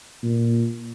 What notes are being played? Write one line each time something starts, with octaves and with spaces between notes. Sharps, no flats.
A#2